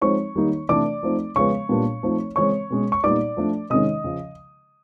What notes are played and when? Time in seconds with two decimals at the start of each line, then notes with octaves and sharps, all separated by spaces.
0.01 F3 G#3 C4 D#4 C#5 C#6
0.35 D#3 G3 A#3 D#4
0.69 C3 E3 A3 D4 D5 D6
1.03 F3 A3 C4 D#4
1.36 C#3 F3 G#3 B3 C#5 C#6
1.69 A#2 G3 B3 D4
2.03 F3 A3 C4 D#4
2.36 C#3 E3 G#3 C4 C#5 C#6
2.70 B2 G#3 C#4
2.92 C#6
3.04 A#2 G3 B3 D#4 D5 D6
3.37 F3 A3 D4
3.70 C3 D#3 G#3 C#4 D#5 D#6
4.04 C#3 F3